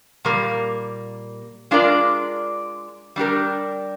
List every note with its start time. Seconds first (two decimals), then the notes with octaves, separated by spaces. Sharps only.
0.25 A#2 G3 A#3
1.71 G#3 D4 F4 A#4 D5
3.16 G3 D4 G4 A#4